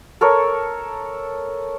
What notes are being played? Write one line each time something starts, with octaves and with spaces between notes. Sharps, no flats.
A4 A#4 C#5